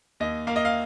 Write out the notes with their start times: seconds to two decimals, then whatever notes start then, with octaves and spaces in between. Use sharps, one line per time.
0.20 D#2 D#5
0.47 A#3 F5
0.56 D#5
0.65 F5